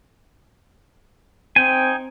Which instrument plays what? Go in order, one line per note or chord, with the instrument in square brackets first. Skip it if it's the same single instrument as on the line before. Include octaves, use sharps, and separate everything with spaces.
[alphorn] C4 [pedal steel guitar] D#4 G5 G#5